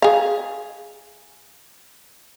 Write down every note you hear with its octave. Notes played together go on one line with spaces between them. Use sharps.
G#4 F5